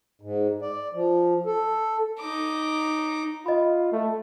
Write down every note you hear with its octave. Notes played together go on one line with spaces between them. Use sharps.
G#2
D5
F3
A4
D#4 D6
F4 D#5 B5
A3